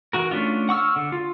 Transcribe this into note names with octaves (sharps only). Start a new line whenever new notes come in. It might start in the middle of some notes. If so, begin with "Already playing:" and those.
E3 F#4 A#4
A3 C#4 D4 F4
F#5 C#6 E6 F6
D3
F4